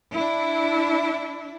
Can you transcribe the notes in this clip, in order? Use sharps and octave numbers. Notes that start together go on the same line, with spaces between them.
D4 E4